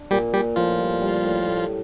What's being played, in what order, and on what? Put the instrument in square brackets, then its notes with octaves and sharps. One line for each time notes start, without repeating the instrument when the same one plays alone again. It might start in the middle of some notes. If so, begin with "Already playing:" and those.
Already playing: [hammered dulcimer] D4
[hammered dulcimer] A#2 [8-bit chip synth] G3 G4
[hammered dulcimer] A#2 [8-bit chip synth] G3 G4
[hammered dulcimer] A2 [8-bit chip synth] F3 F4
[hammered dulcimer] G3
G3
A2
A2